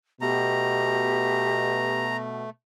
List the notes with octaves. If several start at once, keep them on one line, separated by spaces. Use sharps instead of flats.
B2 A3 G4 A#5